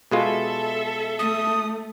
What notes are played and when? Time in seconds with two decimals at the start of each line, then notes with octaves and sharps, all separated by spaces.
0.11 B2 G#3 F4 A4 E5
1.19 A3 D#6